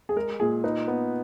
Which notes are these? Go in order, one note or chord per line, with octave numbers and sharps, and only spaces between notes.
G#4
G#3 A#4
A#2 G#4
D#4 B4
B3